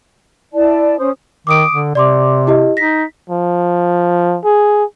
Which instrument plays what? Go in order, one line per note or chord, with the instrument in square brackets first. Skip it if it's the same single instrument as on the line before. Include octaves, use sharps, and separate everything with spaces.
[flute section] E4 D5 A5
C#4 C5 D#6
[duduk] D#3 [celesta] D6 D#6 D7
[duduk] D3
[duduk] C3 [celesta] D5 C6 D6
[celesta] E4 G4 D#5
[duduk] D#4 [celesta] A#6 B6
[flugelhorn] F3
G#4